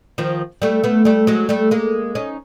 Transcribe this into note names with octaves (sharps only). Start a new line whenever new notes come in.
D#3 F3
G3 A3
A3 B3
G3 A3
F#3 G#3
G3 A3
G#3 A#3
C#4 D#4